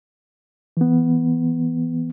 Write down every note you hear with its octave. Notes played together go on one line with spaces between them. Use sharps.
E3 B3